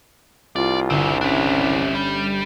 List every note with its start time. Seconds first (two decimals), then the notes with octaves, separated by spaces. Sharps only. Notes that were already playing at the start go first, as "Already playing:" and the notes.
0.56 C2 F4 D5
0.90 G1 C#3 C4 E5
1.21 C#4 D4 E4
1.95 G3 G6